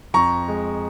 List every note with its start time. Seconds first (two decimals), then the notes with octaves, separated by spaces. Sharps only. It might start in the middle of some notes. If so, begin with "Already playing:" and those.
0.14 F2 A#5 C#6
0.48 G#3